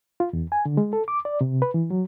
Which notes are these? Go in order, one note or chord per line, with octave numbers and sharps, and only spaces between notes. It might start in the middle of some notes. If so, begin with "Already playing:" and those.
F4
E2
G#5
D3
G#3
A4
D6
D5
C3
B4
E3
F#3